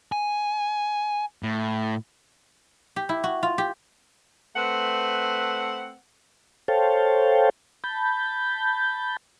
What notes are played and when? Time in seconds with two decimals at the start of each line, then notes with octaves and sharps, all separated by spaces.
0.12 G#5
1.43 A2
2.96 G4
3.09 E4
3.24 F#4
3.43 F4
3.58 G4
4.56 A3 C4 B4 F#5
6.68 A4 C5 C#5 F5 G5 A5
7.84 A5 B5 G6